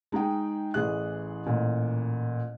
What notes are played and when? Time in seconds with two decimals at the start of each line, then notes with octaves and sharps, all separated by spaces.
0.12 G#3 D#4 G#4 G5
0.74 A1 E3 G#4 F#6
1.46 A1 A#2